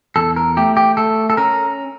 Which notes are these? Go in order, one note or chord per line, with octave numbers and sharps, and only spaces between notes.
E2 A4
A#4
A3 G4
G4
A3 A4
A4
C#4 A#4